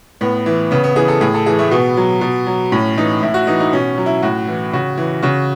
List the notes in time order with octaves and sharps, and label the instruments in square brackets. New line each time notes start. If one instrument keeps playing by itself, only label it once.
[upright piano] A2 B3
E3
C#3 B3
B3
E3 G#4
A4
A2 G#4
A4
E3 G#4
A3
B2 B3
F#3
B2
F#3
A2 C#4
E3 D#4
A2 E4
F#4
E3 D#4
D#4
B2 C#4
F#3
E4
A2 F#4
E3
C#3 F#4
E3
C#3 F#4